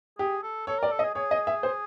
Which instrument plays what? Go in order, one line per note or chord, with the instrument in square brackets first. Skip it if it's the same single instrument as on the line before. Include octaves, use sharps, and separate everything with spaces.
[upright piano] G4 [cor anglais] G#4
[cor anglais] A4
[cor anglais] A4 [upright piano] C#5
[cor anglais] A#4 [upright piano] D5
[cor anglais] A4
[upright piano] D#5
[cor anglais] G#4
[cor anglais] G#4 [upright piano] C#5
[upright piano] D#5
E5
C5